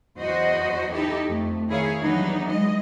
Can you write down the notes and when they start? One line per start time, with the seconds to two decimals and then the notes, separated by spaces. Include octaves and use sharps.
0.18 E2 F#3 F#4 C5 D#5
0.93 D#4 E4 G4 A4
1.28 F2 A3
1.68 D#3 E4 G#4 C#5 F5
2.01 E3 F#3 G3 B3 D4 D#4
2.51 G#3 D#5